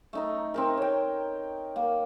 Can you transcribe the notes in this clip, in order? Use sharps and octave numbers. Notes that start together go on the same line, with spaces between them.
A3 D#4 A#5
C4 D#4 A#4
C#5 G5
A#3